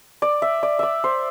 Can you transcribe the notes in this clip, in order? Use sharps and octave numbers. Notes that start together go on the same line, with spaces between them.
D5
E5
D5
D5 E5
C5